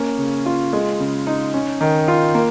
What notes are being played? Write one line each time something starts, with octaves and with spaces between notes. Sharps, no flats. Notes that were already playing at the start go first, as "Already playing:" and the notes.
Already playing: A#3 C#4
C#3
F4
G#3
C#3
D#4
C#4
D#3
F4
A#3